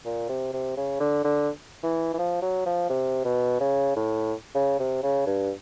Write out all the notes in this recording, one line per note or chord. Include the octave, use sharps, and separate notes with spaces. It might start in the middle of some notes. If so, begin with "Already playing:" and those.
A#2
C3
C3
C#3
D3
D3
E3
E3
F3
F#3
F3
C3
B2
C#3
A2
C#3
C3
C#3
G2